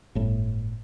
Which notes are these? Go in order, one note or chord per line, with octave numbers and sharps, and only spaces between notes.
G1 A2